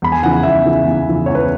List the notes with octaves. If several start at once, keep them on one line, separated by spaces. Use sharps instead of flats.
E2 B5
G#5
C#3 E3 F#5
F#5
E2 E5
C#3 E3
E2
C#3 E3
E2 C#5
B4